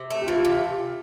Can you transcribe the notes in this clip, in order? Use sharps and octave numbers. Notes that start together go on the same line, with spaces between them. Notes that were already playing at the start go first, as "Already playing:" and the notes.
Already playing: C3
A3
G4
E3 F4
F4
C3
G4